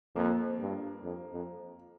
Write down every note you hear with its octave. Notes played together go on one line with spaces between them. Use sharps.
F2 A#3
G2
F2
F2